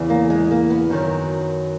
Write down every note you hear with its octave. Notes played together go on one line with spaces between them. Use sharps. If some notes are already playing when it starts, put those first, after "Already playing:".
Already playing: E2 C#3 E3
A#3
G#3
A#3
B3
F#2 D#3 F#3